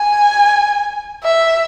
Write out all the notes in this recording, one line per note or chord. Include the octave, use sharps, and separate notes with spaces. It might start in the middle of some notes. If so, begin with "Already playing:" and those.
Already playing: G#5
E5